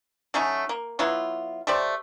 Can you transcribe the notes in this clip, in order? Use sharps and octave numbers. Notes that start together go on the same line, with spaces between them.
F#3 A3 C#4 D#4
A#3
F#3 B3 E4 F4
A3 G4 C5 D5